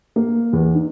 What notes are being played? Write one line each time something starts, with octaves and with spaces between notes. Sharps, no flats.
A#3
E2
D#4